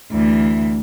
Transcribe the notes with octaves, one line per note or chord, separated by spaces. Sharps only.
D2 E3